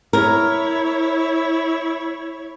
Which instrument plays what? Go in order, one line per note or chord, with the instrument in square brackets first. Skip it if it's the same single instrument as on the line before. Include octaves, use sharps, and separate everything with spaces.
[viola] E4 C#5 [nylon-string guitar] A#4